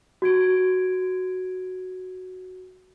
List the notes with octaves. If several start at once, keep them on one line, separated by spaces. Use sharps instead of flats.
F#4 G#6 D7